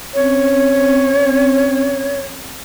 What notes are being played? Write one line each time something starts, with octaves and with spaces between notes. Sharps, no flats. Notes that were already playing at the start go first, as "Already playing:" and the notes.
C4 C#4 C#5